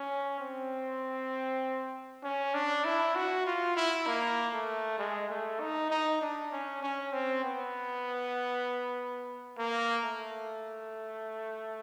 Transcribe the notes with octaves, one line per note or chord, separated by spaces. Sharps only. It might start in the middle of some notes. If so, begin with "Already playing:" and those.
Already playing: C#4
C4
C#4
D4
E4
F#4
F4
E4
A#3
A3
G#3
A3
D#4
D#4
D4
C#4
C#4
C4
B3
A#3
A3